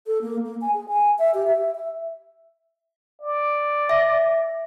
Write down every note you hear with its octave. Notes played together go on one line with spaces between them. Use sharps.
A4
A#3
A#3
G#5
G#4
G#5
E5
G4
E5
E5
D5
E5 A#6